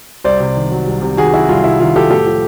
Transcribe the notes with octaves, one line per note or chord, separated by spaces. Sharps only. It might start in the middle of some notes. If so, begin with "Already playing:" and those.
C2 C5 D5
C3
D#3
F#3
C2
C3
D#3 F#4 G#4
F#3 E4 F#4
C2 F4
C3 E4
D#3 F4
F#3 G4 A4
A2 G4 A4
F3